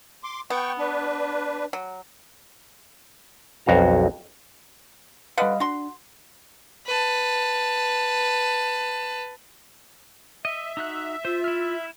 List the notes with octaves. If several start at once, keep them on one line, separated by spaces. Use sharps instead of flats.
C6 D6
B3 G5 C#6
D4 B4
F#3
B1 F2 F#4 F5 A#5
D3 G3 B4 D#5 F5 F#5
D4 F#4 C6
B4 A5
D#5 E5
D#4 F#4 F#6
F4 C5
E4 F6